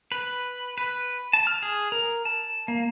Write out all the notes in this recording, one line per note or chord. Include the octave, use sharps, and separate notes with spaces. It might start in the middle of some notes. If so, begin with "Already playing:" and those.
B4
B4
A5
F6
G#4
A#4
A5
A#3